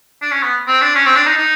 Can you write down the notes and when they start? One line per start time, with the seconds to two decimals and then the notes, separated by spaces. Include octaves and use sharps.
0.22 D4
0.32 C#4
0.43 B3
0.68 C4
0.82 D4
0.95 C#4
1.06 C4
1.16 D4
1.27 D#4
1.38 D#4